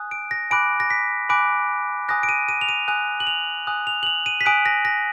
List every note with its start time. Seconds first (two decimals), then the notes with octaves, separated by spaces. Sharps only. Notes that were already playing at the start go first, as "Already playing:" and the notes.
Already playing: G#5 D#6 F#6
0.11 D7
0.31 A#6
0.51 G#5 B5 D6 F#6 D7
0.80 A#6
0.90 B6
1.29 G#5 B5 D6 F#6 D7
2.09 G#5 D#6 F#6 A#6
2.23 D7
2.29 D#7
2.48 D#7
2.61 F7
2.68 D#7
2.88 G#5 D#6 F#6 D#7
3.20 F#7
3.27 F7
3.67 G#5 D#6 F#6
3.87 F7
4.03 F#7
4.07 F7
4.26 D#7
4.41 B6
4.45 G#5 D#6 F#6 D7
4.66 A#6
4.85 A#6